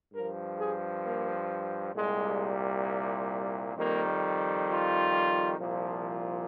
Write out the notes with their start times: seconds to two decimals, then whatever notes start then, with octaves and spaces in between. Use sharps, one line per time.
0.13 G2 F3 A#4
0.58 G#4
1.04 A#3
1.95 C2 A#2 G3 G#3
3.76 F2 D#3 G3 A#3
4.68 F4
5.59 C2 A#2 F3